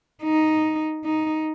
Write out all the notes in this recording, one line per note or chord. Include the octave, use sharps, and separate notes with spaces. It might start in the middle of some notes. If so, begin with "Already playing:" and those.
D#4
D#4